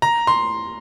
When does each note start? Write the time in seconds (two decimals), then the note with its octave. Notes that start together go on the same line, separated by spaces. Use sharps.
0.02 A#5
0.27 C6